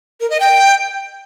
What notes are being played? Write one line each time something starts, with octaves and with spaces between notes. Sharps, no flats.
A#4
D#5
G5